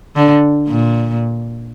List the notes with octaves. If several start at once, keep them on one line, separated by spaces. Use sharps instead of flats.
D3
A#2